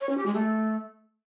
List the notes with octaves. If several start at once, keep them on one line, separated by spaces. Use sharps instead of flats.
C#5
C#4
G4
G#3
A3